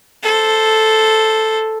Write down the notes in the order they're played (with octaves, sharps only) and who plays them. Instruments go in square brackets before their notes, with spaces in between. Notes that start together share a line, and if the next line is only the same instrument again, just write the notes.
[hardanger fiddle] A4 C5